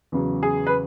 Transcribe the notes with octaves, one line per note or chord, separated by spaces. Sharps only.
E2 C#3 F#3
G#4
B4